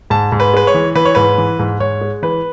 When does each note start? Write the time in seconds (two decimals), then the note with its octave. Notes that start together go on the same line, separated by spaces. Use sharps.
0.10 G#2 A5
0.32 G#2
0.40 B4
0.54 G#3 B4
0.67 C#5
0.75 E3
0.95 E3 B4
1.05 C#5
1.15 G#2 B4
1.38 E3
1.59 G#2
1.80 G#2 C#5
2.01 G#3
2.23 E3 B4